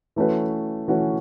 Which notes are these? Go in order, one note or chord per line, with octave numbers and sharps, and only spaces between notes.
E3 A3 C#4 F#4 B4
E3 A3 C#4 F#4 B4